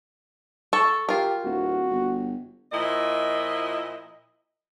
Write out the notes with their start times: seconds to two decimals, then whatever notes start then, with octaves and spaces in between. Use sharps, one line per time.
0.73 A4 C#6
1.09 F4 G4 A#4
1.44 D1 F#4
1.90 G1
2.72 A#2 F3 E4 D#5